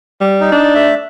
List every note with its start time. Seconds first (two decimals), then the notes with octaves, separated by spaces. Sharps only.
0.21 G3
0.41 D#4
0.52 D4
0.75 A3 E5